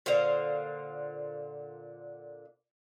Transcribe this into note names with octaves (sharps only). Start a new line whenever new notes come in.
A#2 D3 C5 F5